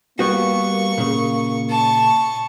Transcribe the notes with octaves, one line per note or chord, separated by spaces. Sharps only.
G3 A#3 B3 F#4 C#6
A#2 C#3
A5 C#6